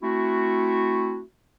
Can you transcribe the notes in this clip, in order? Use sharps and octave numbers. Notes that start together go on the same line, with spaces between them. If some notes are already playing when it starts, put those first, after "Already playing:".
A3 C4 E4 F#4